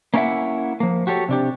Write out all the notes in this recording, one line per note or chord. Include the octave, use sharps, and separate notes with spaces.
A#3 C#4 E4 G#4 E5 F#5
F3 A#3
F#4 G4 A4 C#5
C3 D4 G4